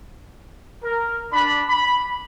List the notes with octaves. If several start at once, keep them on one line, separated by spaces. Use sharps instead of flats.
A#4
D4 B5
B5